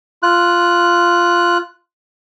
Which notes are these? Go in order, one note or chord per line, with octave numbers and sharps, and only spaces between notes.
F4 F#6